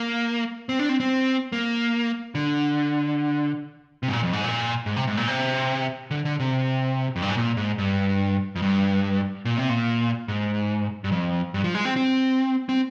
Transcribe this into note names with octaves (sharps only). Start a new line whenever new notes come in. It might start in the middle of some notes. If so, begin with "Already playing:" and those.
Already playing: A#3
C4
D4
C4
C4
A#3
D3
C3
G#2
A#2
F2
G#2
A#2
G#2
C3
G#2
A#2
C3
D3
D3
C3
F2
G2
G#2
A#2
G#2
G2
F2
G2
A#2
C3
A#2
G#2
G2
F2
G2
F3
G#3
C4
C4
C4